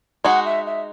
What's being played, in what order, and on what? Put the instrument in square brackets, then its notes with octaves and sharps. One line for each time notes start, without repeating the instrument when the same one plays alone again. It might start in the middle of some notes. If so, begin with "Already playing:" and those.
[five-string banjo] G#3 D#4 F#4 [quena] F#5
[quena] E5
E5